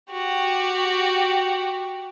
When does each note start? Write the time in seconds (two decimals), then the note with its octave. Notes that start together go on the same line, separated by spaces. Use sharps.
0.12 F#4 G4